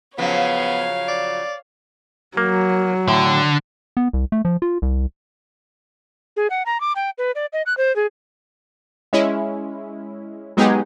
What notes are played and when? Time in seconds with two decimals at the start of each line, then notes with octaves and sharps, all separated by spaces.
0.18 C#3 F3 F#3 B3 C#5 F5
1.08 D5
2.37 F#3 A#3
3.08 A2 D3
3.97 B3
4.13 C2
4.32 A3
4.45 F3
4.62 F4
4.82 C2
6.37 G#4
6.50 F#5
6.66 A#5
6.80 D6
6.96 G5
7.18 B4
7.35 D5
7.53 D#5
7.66 F#6
7.77 C5
7.96 G#4
9.13 G#3 C#4 E4
10.57 F#3 G#3 B3 D#4 G4 G#4